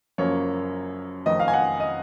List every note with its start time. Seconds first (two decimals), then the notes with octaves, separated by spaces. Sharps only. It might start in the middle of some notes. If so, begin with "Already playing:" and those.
0.18 F#1 F#2 F3 A#3 C#5
1.26 F1 F2 D#3 D#5
1.40 F5
1.48 G#5
1.53 F#5
1.80 D#5